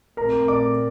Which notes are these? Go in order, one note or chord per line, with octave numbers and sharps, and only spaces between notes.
A#2 A3 C4 A#4 A#5
D5 D6